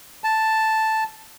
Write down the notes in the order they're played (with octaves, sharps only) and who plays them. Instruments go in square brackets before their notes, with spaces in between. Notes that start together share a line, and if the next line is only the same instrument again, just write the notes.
[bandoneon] A5